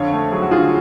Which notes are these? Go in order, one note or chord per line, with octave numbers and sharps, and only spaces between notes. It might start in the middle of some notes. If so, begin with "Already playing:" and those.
Already playing: F2 D3 C#5 F5
A3
F#3 G#4
F#4
D3 F4 G#4